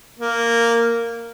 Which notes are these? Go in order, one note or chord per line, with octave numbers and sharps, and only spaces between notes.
A#3